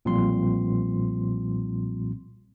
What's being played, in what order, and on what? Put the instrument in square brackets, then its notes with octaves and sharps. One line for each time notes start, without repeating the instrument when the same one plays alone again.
[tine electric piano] B1 A#2 F3 G3 C4 C6